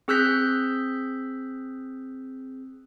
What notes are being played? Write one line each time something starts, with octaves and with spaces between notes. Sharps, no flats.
C4 G#4 E6 F#6 G6 B6